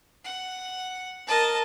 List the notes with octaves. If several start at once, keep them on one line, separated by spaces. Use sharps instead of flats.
F#5
A#4 D#5 A5